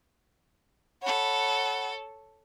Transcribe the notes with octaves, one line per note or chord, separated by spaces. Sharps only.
A4 C#5 F#5 B5